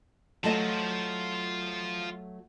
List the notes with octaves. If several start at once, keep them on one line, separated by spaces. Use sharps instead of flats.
F#3 A3 F4 D#5 A5